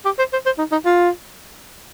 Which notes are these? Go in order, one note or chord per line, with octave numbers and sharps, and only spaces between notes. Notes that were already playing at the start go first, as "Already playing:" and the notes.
G4
C5
C5
C5
D#4
D#4
F4